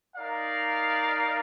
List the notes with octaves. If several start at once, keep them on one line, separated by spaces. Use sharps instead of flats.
D#4 A#4 D5 F5